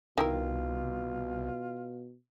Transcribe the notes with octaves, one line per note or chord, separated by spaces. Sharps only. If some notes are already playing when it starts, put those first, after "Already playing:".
C2 B2 D#3 E4 F4 A#4